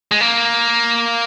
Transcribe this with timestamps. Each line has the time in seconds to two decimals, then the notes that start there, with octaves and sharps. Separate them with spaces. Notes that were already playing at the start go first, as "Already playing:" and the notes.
0.12 G#3
0.21 A#3